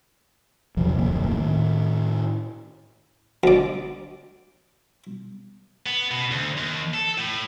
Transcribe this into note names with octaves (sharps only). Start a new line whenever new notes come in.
E2 C3 F3 F#3
D1 B1 F2 A#3
A2 D#3
D2 D5
B3
B2
D2
D#2
A4
A2